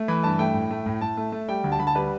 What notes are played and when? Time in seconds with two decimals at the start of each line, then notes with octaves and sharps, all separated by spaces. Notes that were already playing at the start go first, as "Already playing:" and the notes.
Already playing: A3
0.08 E3 B5
0.23 G2 A5
0.39 A3 G5
0.54 A2
0.71 A3
0.86 A2
1.01 A2 A5
1.17 A3
1.32 A3
1.48 G3 G5
1.64 D2
1.72 A5
1.79 D2 B5
1.87 A5
1.95 G3 B4